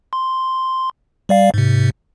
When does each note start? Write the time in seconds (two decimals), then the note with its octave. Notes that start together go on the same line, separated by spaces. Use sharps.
0.13 C6
1.29 G3 D5 F5
1.54 G#2 C3